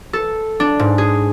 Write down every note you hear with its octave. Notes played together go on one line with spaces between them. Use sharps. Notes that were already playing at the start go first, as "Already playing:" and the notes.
A4
D4
G#2
G#4